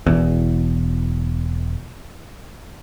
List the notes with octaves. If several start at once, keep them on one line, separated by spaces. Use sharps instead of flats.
E1 E2